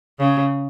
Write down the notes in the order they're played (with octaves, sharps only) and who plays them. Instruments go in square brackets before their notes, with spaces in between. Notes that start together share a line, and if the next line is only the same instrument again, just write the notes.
[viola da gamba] C#3